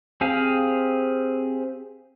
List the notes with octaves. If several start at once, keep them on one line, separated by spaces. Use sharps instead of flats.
C4 G4 G#4 F5